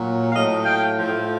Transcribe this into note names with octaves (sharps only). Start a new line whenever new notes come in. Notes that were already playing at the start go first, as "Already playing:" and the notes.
Already playing: A#2 F#3
A2 F#3 D#5 F5
F5 G5
A2 F3